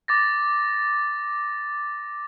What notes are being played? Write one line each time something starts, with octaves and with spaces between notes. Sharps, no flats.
D6 A6 A#6